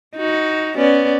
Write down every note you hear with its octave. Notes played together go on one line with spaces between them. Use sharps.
D#4 F#4
B3 C#4 D5